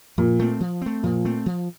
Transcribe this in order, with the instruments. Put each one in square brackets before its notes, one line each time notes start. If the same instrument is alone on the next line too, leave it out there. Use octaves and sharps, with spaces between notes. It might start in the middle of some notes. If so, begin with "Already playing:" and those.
[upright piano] A#2 [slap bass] F3
[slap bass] A3 C4
F3
A3 C4
[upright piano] A#2 [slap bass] F3
[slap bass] A3 C4
F3